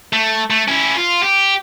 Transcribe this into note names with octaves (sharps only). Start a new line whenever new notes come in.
A3
A3
C#4 E4
F4
G4